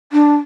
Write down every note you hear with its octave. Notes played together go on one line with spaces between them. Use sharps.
D4